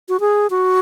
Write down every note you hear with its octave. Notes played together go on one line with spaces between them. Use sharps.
F#4
G#4
F#4